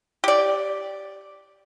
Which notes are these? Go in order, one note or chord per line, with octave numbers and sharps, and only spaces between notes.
G4 D5